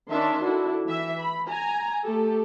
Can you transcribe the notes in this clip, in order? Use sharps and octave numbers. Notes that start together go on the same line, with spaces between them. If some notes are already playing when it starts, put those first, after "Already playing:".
D#3 C#4 D4 E5 A5 C6
D4 E4 F#4 A4
E3 E5
B5
G#5 A#5
A3 G4 A4